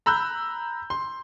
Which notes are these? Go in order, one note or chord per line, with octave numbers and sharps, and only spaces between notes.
A#5 B5 E6 F#6 G6
C6